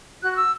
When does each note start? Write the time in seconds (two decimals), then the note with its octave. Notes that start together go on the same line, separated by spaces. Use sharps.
0.22 F#4 F#6
0.33 F#6
0.37 E6